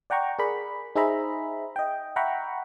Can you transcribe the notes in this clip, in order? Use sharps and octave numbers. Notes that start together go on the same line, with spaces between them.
D5 F#5 G5 A#5 C#6
G#4 A#4 D5 B5
D#4 G#4 C5 E5 A#5 B5
D#5 G5
E5 F#5 G5 A#5 B5 C#6